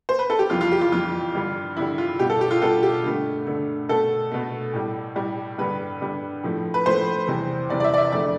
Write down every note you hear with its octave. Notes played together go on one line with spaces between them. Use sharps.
C5
B4
A4
G4
F2 E3 G3 F4
F4
G4
F4
F2 E3 G3 F4
G2 D3 G3
G2 D3 G3 E4
F4
B2 G3 G4
A4
G4
F4
B2 G3 A4
G4
G2 D3 A3
G2 D3 A3
B2 A3 A4
B2 A3
A2 G3
A2 G3
G2 D3 G3 B4
G2 D3 G3
A2 F3 A3
B4
A2 F3 A3 C5
E2 C3 E3 G3
E2 C3 E3 G3 D5
D5
E5
D5
E5
F2 D3 A3 D5